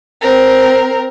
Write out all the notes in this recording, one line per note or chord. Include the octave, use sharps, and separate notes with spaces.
C4 A#4